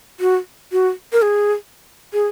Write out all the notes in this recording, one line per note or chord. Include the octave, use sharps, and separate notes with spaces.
F#4
F#4
A#4
G#4
G#4